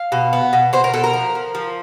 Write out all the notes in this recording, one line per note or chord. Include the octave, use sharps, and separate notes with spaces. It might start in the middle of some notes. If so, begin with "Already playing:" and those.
Already playing: F5
B2
B3
B2
B2 C5
A#4
B2 A4
A#4
F3
F3
F3